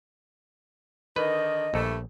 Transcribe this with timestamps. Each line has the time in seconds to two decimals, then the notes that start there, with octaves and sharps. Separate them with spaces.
1.16 D3 D#3 B4 D#5
1.74 A#1 G2 A3